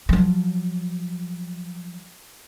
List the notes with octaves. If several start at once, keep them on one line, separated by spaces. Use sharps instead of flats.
F3 F#3